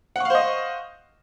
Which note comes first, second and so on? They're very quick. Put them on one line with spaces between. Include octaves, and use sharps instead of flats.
F#5 C#6 F5 C5 D#5